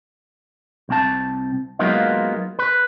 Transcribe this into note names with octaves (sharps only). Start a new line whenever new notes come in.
C2 C4 A5
F#3 G#3 A#3 B3 D#4 F4
B4